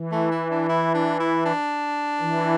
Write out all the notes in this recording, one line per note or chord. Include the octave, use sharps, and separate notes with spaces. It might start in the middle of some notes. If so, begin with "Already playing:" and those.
Already playing: E3
A3
E4
D4
E4
D4
E4
D4
E3